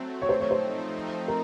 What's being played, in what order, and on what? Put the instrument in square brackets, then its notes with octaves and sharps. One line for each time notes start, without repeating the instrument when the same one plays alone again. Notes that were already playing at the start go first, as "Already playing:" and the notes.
Already playing: [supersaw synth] F#3 A3 C4
[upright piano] C#5
[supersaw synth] F3 A3 C4 D#4 [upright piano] C5
[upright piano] C#5
C5
A#4